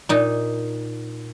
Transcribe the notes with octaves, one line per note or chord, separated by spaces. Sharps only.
A#2 D#4